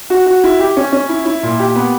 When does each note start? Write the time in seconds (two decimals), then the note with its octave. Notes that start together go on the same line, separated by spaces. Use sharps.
0.10 F#4
0.26 F#4
0.44 E4
0.60 G4
0.77 C#4
0.92 C#4
1.09 E4
1.26 E4
1.43 A#2
1.59 G4
1.76 B3